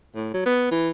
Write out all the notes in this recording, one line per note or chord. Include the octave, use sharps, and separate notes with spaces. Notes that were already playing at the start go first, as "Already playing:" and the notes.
A2
F#3
B3
E3